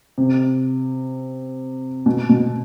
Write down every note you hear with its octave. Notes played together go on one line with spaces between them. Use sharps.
C3
B2
B2